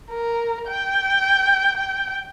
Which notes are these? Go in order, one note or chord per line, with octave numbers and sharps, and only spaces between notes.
A#4
G5
G5